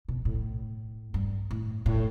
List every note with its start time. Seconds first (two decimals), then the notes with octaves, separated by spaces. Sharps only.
0.08 B2
0.25 A2
1.14 G2
1.51 A2
1.86 A2